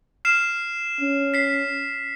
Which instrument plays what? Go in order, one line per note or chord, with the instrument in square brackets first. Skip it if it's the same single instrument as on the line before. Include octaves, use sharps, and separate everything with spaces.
[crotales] F6 C7 E7
[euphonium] C#4
[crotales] B6 C7